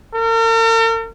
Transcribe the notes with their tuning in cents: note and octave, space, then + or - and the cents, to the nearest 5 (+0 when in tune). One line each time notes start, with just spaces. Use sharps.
A#4 -45